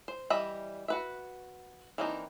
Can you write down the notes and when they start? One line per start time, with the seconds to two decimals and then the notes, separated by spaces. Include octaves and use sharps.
0.08 C5
0.30 E3 G3 D#5 E5 B5
0.88 F#4 B4 E5
1.98 E3 A#3 C4 D4 D#4